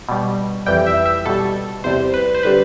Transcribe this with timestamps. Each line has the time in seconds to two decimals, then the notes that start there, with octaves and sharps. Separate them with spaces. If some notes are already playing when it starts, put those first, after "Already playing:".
0.09 B2 G3
0.66 F2 E3 G3 G5
0.86 E5
1.06 E5
1.26 B2 G3 A4
1.84 E2 C3 G3 C5
2.14 B4
2.35 C5
2.43 D3 G3 B4